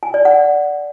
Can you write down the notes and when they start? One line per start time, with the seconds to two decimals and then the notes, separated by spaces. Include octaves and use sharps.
0.03 G#5
0.14 D5
0.25 F#5